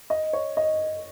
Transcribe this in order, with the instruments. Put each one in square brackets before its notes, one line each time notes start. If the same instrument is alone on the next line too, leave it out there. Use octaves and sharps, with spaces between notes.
[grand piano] D#5
C#5
D#5